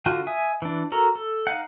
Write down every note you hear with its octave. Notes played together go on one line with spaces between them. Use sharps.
D3 F4 F#4
E5 G#5 D#6
E3 D4
F#4 A4 A#4 A#5
A4
D#4 F5 F#5